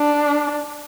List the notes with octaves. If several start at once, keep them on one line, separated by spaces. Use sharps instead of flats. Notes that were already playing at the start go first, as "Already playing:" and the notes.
Already playing: D4